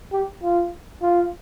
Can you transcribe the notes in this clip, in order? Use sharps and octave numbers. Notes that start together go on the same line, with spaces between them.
G4
F4
F4